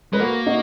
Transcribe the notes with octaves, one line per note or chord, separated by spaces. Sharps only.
G#3 B4
A#3 F#4 A#4
D#4 F#4